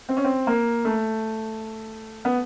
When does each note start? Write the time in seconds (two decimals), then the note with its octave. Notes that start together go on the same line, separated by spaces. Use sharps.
0.09 C4
0.17 C#4
0.24 C4
0.47 A#3
0.85 A3
2.25 B3